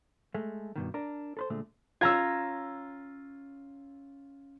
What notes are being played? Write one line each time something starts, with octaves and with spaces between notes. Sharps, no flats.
G#3 A3
G2 B2 D#3
D4 A#4
A4 B4 C5
A#2 D3 G#3 A3
C#4 F4 A#5 E6 G#6